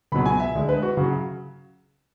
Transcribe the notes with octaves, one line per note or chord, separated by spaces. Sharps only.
C#2 B2 F#3 B5
G#5
E5
D2 D3 G#3
B4
F#4
C#3 F#3 F#4